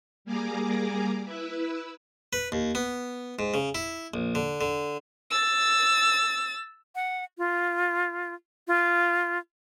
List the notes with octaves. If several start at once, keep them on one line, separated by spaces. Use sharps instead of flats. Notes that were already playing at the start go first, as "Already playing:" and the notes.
G3 A#3 G#4 G#5 A#5 D6
E4 B4 E5
B4
D#2
B3
G#2
C#3
E4
A#1
D3
D3
E6 A6
F#5
F4
F4